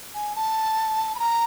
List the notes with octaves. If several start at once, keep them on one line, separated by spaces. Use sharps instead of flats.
G#5
A5
B5
A#5